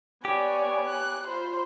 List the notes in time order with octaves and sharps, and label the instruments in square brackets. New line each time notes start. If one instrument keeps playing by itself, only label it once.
[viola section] B3 C#5 G#5 [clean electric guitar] G4 [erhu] D5
[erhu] F#6
[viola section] F4 B5 [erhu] C5